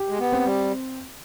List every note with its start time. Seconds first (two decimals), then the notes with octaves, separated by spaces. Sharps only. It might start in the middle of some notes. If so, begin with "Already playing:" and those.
Already playing: G4
0.09 G#3
0.19 B3
0.32 C4
0.45 G3